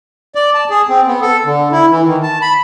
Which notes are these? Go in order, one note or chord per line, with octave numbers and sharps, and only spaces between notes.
D5
A5
G#4
C4
B3
A4
D3
E4
E3
D#3
A5
B5